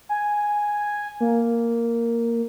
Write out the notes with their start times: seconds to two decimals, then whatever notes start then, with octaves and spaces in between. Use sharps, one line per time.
0.09 G#5
1.21 A#3